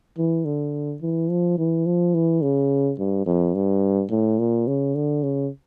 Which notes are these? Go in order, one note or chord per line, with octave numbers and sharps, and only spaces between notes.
E3
D3
E3
F3
E3
F3
E3
C#3
G2
F2
G2
A2
A#2
C#3
D3
C#3